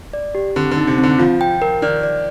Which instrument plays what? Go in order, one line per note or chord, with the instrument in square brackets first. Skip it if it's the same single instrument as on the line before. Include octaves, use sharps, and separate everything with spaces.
[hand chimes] D5
G4
[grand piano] D3 [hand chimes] C4
[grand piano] D3
[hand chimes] D#4
[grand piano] C3
[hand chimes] C4
[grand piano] D3
[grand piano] F3 [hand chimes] F4
[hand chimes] G5
A#4
[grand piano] D#3 [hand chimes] D5
[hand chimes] D5